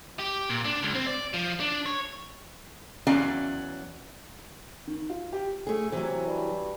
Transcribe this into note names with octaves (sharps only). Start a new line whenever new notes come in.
G4
A#2
D4
C#2
C4
D5
F3
D4
C#5
E2 F#3 C#4 D5 F5 A#5
D#3
F4
G4
A3 G#4
C3 E3 F#3
G2